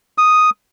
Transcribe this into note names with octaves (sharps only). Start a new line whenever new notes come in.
D#6